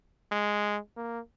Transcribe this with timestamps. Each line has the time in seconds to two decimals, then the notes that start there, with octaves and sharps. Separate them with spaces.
0.32 G#3
0.97 A#3